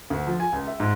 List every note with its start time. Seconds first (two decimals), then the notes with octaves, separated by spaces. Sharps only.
0.10 D2
0.27 F3
0.40 G#5
0.53 C#2
0.67 E5
0.80 G#2